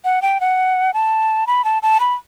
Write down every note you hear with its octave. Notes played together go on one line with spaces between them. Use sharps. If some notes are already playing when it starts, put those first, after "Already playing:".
F#5
G5
F#5
A5
B5
A5
A5
B5